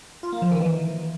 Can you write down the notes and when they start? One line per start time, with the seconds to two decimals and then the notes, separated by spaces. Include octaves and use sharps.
0.23 F4
0.32 A#3
0.42 F3
0.51 D#3
0.61 E3